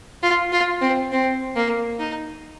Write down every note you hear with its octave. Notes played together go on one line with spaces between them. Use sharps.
F4
F4
C4
C4
A#3
D#4